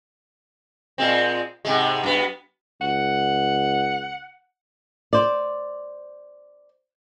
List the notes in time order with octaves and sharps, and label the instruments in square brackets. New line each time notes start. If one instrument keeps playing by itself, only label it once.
[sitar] A#2 G#3 C4
G#2 C3 G#3
F#2 B3
[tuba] C#2 [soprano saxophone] F#5
[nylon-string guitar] C5 D5